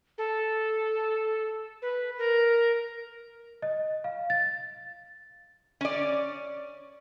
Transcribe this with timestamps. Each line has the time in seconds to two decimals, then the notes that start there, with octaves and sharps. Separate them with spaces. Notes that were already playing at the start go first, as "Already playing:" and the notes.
0.18 A4
1.82 B4
2.18 A#4
3.62 D#5
4.04 F5
4.30 A6
5.81 C#4 D5